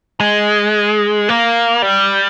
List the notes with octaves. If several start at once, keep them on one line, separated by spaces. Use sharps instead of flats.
G#3
A#3
G3